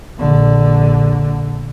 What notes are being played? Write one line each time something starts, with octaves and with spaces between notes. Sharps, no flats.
A#1 D3